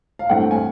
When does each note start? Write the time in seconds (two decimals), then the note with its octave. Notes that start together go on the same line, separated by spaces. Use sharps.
0.19 F5
0.29 G2 E3 A3 C4 F#5
0.40 G5
0.51 G#5